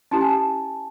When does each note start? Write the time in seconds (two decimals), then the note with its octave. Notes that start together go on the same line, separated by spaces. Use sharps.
0.11 C#4 E4 G4 A5
0.21 G#5
0.29 A5